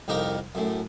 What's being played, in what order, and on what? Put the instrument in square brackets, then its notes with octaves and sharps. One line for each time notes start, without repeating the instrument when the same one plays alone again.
[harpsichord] C2 F2 D#4 G4 A#4 G5
F#2 A2